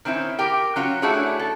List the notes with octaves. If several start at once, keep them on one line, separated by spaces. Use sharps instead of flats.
D#3 C4 C#4 E4
G4 A#4 G5
F#3 C#4 F4 F#4
A3 D4 E4 F#4 G#4 C#5
A4